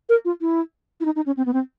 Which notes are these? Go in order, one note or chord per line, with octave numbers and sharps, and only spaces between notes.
A#4
F4
E4
E4
D#4
D#4
C#4
C4
B3
C4